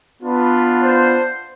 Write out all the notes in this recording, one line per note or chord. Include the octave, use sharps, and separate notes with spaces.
B3 D4 F4 B4
C5